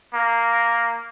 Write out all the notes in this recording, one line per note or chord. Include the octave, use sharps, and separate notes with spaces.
A#3